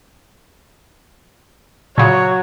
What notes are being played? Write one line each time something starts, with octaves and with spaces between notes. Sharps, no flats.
A#2 C#3 F#3 C#5